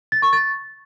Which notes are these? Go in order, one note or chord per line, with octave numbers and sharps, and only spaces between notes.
A6
C#6
A6